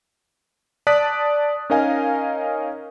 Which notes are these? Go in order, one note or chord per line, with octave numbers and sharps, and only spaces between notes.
D5 A5 D#6 F#6 B6
C#4 D#4 A#4 D#5 F5 G#5